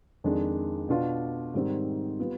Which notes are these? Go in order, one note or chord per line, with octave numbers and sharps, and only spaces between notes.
F2 D#3 G#3 D4
B2 B3 D4 F4
G#2 D#3 G3 C4
G3 B3 F4